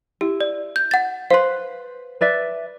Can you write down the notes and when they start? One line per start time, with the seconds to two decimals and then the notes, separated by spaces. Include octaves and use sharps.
0.21 E4 G4
0.41 D5
0.76 G6
0.91 F#5 A6
1.30 B4 C5 F5 C6
2.21 B4 D5 E5